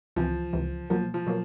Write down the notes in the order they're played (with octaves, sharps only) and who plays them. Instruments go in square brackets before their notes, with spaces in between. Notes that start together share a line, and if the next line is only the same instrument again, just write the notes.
[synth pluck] C#2 C3 E3 [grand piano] F3
[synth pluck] C#2 C3 E3
[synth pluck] B2 F#3 A#3 [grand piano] F3
[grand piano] F3
[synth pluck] B2 F#3 A#3